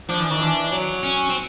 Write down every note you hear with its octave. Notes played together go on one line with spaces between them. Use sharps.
F3 D4
E3
D#3
E3
F#3
C#4
C4